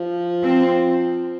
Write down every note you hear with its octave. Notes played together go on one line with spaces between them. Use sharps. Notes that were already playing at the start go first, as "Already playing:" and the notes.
Already playing: F3
C4